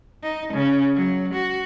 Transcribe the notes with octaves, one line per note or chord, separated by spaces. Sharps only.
D#4
C#3
F#3
F#4